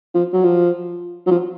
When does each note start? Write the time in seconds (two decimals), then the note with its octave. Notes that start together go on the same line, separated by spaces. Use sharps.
0.14 F3
0.33 F#3
0.44 F3
1.27 F#3
1.31 F3